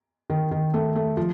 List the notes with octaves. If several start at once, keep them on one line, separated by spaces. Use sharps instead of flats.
D#3
D#3
A3
A3
F3